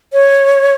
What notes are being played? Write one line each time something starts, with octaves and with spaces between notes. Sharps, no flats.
C#5